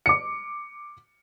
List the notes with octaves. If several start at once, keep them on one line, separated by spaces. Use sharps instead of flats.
D6 C#7